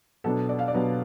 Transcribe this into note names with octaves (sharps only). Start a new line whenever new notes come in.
B2 F#3 B3 D4 A4
D5
F5
D5
B2 F#3 B3 D4